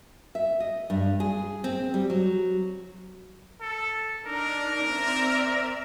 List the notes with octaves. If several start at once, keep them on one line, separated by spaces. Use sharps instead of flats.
E5
D#5
G2
G#4
C4
G3
F#3
A4
D4 D#4 A#4
C4 D5 E5